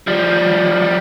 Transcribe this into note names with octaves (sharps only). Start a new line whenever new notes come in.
F3 G3